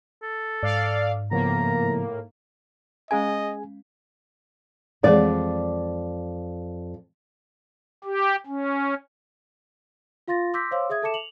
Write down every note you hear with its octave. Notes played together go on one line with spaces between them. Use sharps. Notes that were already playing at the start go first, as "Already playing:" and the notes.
A4
G#2 D5 F5
A2 C#3 F3 A#3 B3 A#5
G#3 C#4 G#4 D#5 F5 G#5
F2 E3 G#3 G#4 D5
G4
C#4
F4 F5 C6 A6 A#6
C6 D6 E6 G6 A#6 B6
C5 C#5 F5 C6 D6 E6
G#4 E5 D#6 G#6
A4 E5 A5 D6 C#7 E7
F7 F#7